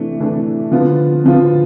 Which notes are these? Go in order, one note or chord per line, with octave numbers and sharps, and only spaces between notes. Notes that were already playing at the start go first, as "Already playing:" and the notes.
Already playing: C3 E3 A3 D4
C3 E3 A3 D4
D3 F3 B3 F4
D3 F3 B3 F4